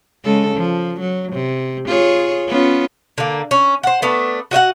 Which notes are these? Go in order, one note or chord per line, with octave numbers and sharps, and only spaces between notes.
C#3 G#3 A4
F3
F#3
C3
F4 G#4 C#5
B3 C#4 F4
D3 A#3
C#4
C5 F#5
A3 B3 D4
F#4 D#5 E5 F#5